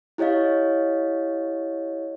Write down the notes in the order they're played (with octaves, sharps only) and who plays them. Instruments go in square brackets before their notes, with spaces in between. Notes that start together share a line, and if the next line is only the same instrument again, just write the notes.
[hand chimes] E4 G4 C#5 D#5 F5